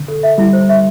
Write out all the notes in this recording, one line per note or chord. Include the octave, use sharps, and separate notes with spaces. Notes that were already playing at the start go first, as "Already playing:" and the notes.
Already playing: D3
A4
E5
G3 E4
C5
E5